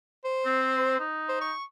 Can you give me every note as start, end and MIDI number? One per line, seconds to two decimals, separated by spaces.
0.25 1.02 72
0.46 0.97 60
1.00 1.51 63
1.29 1.41 72
1.41 1.64 85